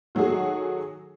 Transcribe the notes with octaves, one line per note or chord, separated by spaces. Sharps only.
D#3 F#3 A3 F#4 G#4